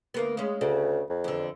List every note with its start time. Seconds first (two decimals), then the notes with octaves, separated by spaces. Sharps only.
0.14 D2 A#3 B3
0.37 G#3 C#4
0.61 D2 C#3
1.10 F2
1.24 E2 D3